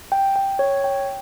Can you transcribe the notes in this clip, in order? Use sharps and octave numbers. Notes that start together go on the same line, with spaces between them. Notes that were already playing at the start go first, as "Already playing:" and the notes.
G5
G5
C#5
G5